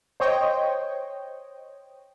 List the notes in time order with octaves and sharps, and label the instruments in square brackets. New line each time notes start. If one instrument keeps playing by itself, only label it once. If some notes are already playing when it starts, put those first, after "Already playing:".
[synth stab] C5 C#5 D#5 G5